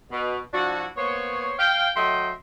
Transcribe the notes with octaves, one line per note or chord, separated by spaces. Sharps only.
B2
F3 D4 E4 F#4
A#3 B3 C5 C#5
F5 G5
F#3 A3 D#5 E5 G5 C6